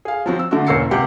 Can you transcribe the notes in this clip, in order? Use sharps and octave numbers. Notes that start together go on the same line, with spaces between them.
G#4 F5
F3 F#3 C4
E6
D3 A3 F#4
E1 A#3 C#4 E6 C7 C#7
C#2 C3 G4 F#5